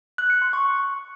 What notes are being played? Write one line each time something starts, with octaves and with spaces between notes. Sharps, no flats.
F#6
C#7
C6
C#6